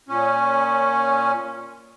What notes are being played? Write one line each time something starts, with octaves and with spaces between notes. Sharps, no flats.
A#2 C#4